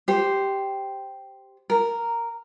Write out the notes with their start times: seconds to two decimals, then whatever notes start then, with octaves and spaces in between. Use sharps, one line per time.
0.08 G4 C5
1.70 A#4